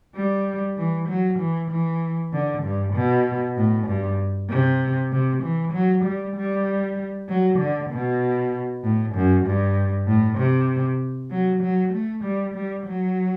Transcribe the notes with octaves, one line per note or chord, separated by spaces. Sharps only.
G3
E3
F#3
E3
E3
D3
G2
B2
A2
G2
C3
C3
E3
F#3
G3
G3
F#3
D3
B2
A2
F#2
G2
A2
C3
F#3
F#3
A3
G3
G3
F#3